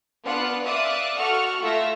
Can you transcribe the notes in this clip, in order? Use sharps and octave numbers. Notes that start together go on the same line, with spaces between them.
B3 D4 F4 F#5 F#6
D5 E5 F5 D6 D#6 F#6
F#4 A4 F#5 C#6 F6
A3 F4 E5 A#6